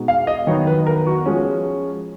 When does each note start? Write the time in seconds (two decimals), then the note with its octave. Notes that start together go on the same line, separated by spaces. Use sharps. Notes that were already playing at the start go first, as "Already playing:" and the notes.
Already playing: B2 G#3 D#4
0.08 F5
0.27 D#5
0.47 D#3 F#3 B3 D#4 C#5
0.67 B4
0.87 A#4
1.07 F#4
1.26 F3 G#3 C#4